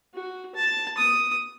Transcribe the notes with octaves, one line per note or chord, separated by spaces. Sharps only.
F#4
A5
D#6